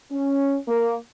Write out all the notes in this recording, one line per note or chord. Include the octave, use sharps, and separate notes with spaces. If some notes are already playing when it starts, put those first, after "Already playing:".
C#4
A#3